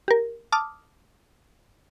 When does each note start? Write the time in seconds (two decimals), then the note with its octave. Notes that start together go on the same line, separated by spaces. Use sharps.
0.08 G4 A#4
0.52 A5 D6 D#6 F6